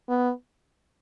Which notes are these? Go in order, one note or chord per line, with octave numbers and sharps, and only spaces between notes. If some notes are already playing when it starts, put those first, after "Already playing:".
B3